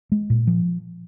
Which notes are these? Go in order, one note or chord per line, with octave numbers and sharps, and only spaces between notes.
G#3
A#2
F3